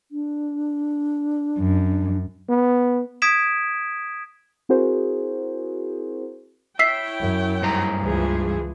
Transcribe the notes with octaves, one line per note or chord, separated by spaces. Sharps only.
D4
F#2
B3
D#6 G#6 B6 D7 E7
C4 E4 F#4 G#4 A#4 C5
E4 C#5 E5 G5 E6 B6 C7
F#2
G2 C5 A#5
C#2 E3 F3 G#4